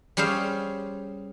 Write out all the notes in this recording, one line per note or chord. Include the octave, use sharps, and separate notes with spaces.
G3 C#4 G#4 C5 F5